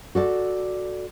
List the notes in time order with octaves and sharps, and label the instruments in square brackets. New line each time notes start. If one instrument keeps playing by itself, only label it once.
[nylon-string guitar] F#4 A4 D5